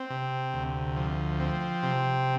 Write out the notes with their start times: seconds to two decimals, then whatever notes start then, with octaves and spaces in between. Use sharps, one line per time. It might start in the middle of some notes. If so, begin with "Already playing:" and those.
Already playing: C4
0.10 C3
0.54 D2
0.96 F3
1.40 C4
1.83 C3